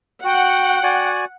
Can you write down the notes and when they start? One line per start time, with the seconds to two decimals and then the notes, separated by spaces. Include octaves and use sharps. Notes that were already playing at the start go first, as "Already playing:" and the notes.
0.24 F#4 F#5 G5
0.83 F#4 D5 G#5